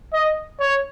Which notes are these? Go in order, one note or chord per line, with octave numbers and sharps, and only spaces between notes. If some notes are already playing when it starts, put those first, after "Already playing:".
D#5
C#5